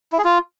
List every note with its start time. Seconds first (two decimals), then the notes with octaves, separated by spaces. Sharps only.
0.12 E4
0.18 G#4
0.24 F4